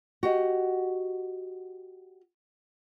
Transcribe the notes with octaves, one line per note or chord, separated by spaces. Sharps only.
F#4 G4 D#5